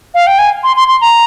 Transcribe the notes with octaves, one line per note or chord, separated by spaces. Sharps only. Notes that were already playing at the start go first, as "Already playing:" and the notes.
F5
G5
G#5
C6
C6
C6
A#5